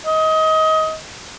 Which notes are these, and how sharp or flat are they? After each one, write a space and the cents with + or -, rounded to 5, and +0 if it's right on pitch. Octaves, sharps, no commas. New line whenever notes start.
D#5 +25